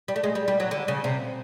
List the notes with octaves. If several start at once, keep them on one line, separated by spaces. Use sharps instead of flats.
G3
A3
G#3
G3
G3
F#3
D3
C#3
C3